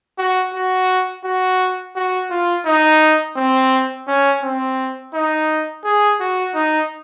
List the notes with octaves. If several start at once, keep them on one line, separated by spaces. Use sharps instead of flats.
F#4
F#4
F#4
F#4
F4
D#4
C4
C#4
C4
D#4
G#4
F#4
D#4